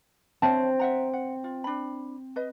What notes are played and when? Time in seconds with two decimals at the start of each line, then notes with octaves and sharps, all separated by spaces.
0.42 C4 C#5 E5 A5
0.80 E5 F#5 A#5
1.13 F#5
1.44 F4
1.64 D4 B5
2.36 B4 D#5